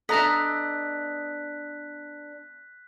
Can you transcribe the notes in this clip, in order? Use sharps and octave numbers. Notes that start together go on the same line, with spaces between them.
B3 D4 A4 D#5 E5 A#5 F#6 B6